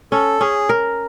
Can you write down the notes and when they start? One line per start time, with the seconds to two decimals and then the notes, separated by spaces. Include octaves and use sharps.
0.12 C#4 A4
0.41 C#4 G#4
0.69 A#4